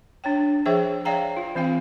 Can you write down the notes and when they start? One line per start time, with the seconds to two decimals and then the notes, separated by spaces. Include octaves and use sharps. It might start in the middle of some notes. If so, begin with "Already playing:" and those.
0.24 D4 C#5 G5
0.66 F3 G#4 C5 C#5 E5 G5
1.05 C#5 D5 F5 G5 A#5
1.37 F4
1.55 E3 C4 F5 G#5